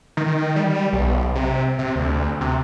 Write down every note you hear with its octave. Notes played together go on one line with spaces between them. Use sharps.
D#3
G3
B1
C3
C3
D2
C3